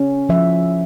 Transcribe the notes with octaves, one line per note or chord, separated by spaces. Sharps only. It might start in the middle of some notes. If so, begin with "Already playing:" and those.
Already playing: C#4
F3 E5